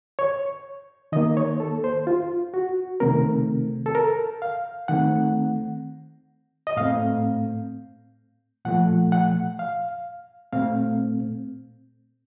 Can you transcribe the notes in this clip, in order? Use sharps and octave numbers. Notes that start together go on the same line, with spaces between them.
C#5
D#3 A#3 D#5
C#5
A4
C5
F4
F#4
C3 D#3 A3 C4 A#4
A4
A#4
F5
D#3 A3 C4 F#5
D#5
A2 A3 C4 F5
A#2 F3 A3 F#5
F#5
F5
A#2 A3 C4 F5